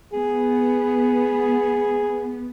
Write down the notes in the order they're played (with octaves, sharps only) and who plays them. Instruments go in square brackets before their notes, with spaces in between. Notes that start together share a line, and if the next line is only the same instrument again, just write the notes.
[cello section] B3 [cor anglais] G#4